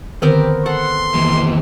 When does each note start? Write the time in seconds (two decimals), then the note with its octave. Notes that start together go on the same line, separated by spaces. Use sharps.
0.22 D3 D#3 B3 C4 G4 A#4
0.66 A4 F#5 C6
1.14 D#2 E3